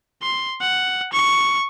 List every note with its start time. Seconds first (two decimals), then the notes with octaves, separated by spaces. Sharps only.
0.22 C6
0.61 F#5
1.13 C#6